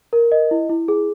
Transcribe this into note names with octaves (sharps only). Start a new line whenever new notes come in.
A#4
D#5
E4
E4
G#4